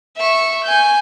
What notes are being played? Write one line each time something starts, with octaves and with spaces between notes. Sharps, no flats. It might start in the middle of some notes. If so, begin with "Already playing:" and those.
E5 C#6
G#5 G6